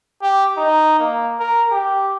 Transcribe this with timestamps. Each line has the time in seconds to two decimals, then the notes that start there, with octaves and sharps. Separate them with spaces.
0.22 G4
0.58 D#4
1.00 A#3
1.40 A#4
1.72 G4